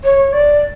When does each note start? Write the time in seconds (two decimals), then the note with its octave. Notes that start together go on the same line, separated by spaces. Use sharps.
0.04 C#5
0.33 D5